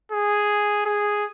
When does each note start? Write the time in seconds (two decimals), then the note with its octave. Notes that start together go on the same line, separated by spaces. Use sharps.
0.12 G#4
0.86 G#4